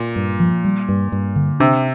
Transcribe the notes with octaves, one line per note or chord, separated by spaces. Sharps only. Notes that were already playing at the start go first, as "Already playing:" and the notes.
Already playing: A#2
G2
F3
G3
G2
G2
D3
C3 D4